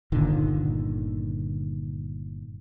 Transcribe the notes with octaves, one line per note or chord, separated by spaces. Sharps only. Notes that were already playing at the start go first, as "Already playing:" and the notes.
G1 A#2 D3 D#3